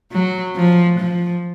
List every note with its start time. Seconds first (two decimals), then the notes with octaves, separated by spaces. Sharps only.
0.12 F#3
0.55 F3
0.98 F3